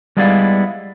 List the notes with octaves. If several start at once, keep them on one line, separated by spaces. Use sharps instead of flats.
G3 G#3 B3 E4 D5 F5